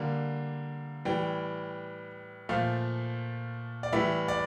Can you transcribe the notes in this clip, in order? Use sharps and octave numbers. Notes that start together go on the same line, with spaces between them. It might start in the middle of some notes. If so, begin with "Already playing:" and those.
Already playing: D3 G3 A#3
A2 E3 G3 G5
A#2 F3 A3 F5
D5
A2 E3 G3 E5
D5